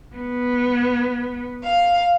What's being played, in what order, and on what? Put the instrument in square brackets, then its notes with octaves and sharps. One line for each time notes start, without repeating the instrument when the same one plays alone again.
[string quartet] B3
F5